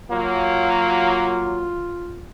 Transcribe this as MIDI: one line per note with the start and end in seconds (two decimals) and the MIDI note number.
0.10 1.72 54
0.10 1.72 58
0.10 2.26 65